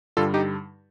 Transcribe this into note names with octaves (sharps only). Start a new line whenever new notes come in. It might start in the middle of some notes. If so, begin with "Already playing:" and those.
G2 D3 G3 F4 A4
D#4 G4